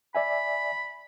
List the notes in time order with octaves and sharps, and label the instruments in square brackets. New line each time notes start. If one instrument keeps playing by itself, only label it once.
[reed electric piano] D5 E5 G#5 [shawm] B5